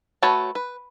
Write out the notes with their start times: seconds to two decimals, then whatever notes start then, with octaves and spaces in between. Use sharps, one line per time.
0.22 A3 F#4 B4 C#5 A5
0.55 B4